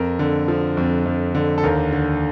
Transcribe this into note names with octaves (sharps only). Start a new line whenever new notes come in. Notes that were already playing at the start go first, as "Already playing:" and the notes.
Already playing: F2 A#4
D3
F3
F2
F2
D3
A4
D#2 A#4
D3